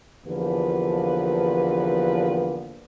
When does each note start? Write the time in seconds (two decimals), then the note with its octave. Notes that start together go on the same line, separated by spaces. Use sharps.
0.26 E2 D3 F3 A#3 G4 B4